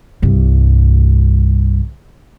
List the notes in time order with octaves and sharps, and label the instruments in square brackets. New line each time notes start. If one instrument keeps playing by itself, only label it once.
[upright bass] C2 G2